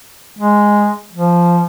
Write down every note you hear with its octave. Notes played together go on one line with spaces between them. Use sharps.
G#3
F3